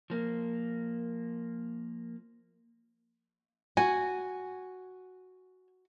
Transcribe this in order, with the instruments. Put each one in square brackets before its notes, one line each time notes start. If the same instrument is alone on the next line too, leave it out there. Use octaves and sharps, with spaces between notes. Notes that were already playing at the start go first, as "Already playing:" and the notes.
[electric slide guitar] F3 A#3
[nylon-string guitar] F#4 [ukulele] G#5